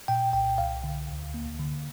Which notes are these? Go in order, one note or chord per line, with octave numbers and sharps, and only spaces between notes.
A#2 G5
C2 G5
C2 F5
D3
D2
A#3
D3